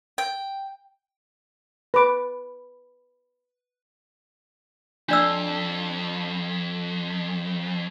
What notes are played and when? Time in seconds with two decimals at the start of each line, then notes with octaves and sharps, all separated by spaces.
0.18 G5
1.94 B4 D6
5.09 F2 D4 D5 E6